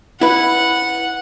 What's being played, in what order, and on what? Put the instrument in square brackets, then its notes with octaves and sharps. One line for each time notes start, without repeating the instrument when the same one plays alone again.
[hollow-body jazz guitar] E4 B4 [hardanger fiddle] F#5